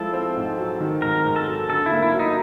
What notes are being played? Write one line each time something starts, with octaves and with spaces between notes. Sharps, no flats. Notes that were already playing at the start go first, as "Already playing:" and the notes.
Already playing: F3 G#3 E4 A4
C4
G#2
F#3
D#3
G#2 A#4
G#2
A4
F#3
D3 A4
E4
A#3
E4
F#3
D#4